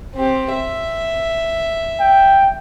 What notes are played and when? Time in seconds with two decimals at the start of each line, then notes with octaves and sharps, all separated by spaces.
0.15 C4 G4
0.53 E5
2.00 G5